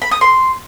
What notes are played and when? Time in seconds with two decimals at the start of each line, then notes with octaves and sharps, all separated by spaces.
0.02 B5
0.11 D#6
0.21 C6